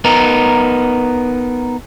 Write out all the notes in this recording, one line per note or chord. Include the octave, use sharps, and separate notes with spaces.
B3 D#4 A#4